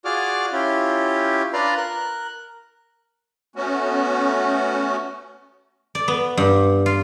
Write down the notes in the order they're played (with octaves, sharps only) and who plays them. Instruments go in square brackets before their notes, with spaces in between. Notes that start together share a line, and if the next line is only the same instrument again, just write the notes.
[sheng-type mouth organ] F4 F#4 G#4 D5 D6 F6
C#4 E4 F4 G4
D4 F4 B4 D5 A#5 C6
A#4 F#6
[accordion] A3 B3 C#4 F#4
[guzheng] D5
B3
G2
F4